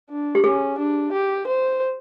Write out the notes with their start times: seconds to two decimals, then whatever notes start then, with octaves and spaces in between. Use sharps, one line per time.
0.10 D4
0.35 G4
0.44 C#4 G#4
0.78 D4
1.13 G4
1.47 C5